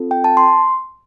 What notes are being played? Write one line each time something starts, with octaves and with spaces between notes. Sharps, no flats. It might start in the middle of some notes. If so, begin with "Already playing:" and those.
Already playing: C4 F4 A4
G5
A5
C6